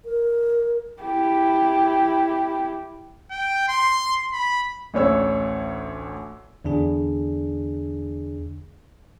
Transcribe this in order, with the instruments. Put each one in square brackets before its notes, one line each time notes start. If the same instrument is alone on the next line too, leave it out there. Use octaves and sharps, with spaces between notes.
[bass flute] A#4
[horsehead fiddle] E4 G4
[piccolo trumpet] G5
C6
B5
[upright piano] A1 D2 C#5 E6
[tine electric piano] E2 D3 D4 G#4